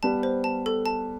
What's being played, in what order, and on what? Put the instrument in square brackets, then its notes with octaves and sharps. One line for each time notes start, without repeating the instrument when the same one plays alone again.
[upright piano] G3 B3 [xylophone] A5
[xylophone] C5
A5
A4
A5